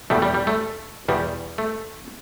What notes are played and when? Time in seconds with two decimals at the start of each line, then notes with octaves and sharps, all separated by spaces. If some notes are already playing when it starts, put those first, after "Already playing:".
0.10 E2 B2 G3 A3
0.22 G3
0.34 G3
0.47 A3
1.08 E2 B2 G3
1.58 A3